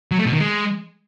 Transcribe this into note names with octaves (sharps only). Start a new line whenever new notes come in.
F#3
A3
B2
D#3
G#3